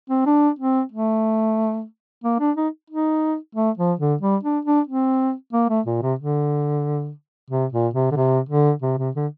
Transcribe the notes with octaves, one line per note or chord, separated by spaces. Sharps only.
C4
D4
C4
A3
A#3
D4
D#4
D#4
A3
F3
D3
G3
D4
D4
C4
A#3
A3
A#2
C3
D3
C3
A#2
C3
D3
C3
D3
C3
C3
D3